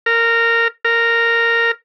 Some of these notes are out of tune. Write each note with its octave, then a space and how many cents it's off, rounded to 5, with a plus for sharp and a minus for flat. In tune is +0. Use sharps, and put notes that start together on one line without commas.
A#4 -15
A#4 -10